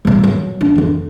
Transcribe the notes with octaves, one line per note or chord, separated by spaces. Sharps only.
A#2 G3
F#3
D4
F2 D3